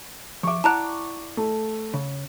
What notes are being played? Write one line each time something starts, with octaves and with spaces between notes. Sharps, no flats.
F3 E5 C#6 D6
E4 D5 F#5 A5 A#5 F#6
A3
C#3